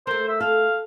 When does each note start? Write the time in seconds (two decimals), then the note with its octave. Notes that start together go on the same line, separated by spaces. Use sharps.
0.07 A3 A#4 C5
0.29 E5
0.40 A4 F5